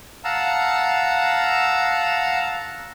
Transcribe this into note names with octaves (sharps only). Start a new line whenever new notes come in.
F5 F#5 A5 A#5 E6